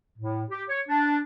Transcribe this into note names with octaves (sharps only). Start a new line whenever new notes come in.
A2
G4
C#5
D4